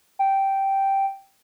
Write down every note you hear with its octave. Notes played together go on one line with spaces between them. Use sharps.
G5